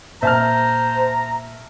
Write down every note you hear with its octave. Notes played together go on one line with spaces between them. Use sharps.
A#2 C5 E5 A5 A#5 F6